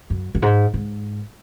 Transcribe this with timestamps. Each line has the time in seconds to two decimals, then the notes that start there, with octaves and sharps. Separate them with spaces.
0.10 F#2
0.35 F#2
0.42 G#2
0.74 G#2